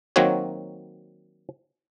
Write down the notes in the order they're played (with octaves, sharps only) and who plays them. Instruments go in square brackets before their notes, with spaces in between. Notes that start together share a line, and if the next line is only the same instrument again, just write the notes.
[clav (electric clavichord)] D#3 F#3 A#3 C4 F#4 C#5